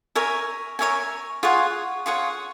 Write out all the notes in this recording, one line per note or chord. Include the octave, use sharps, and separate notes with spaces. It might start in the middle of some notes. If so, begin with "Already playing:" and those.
A#4 C#5 E5 G#5
A#4 C#5 E5 G#5
F4 G#4 C#5 F#5
F4 G#4 C#5 F#5